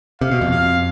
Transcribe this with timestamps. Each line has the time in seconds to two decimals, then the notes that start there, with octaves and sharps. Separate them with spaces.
0.21 C3 F5
0.31 B2
0.41 F2
0.51 F5